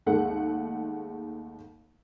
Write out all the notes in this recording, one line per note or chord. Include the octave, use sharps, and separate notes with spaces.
D#2 G#3 A3 F#5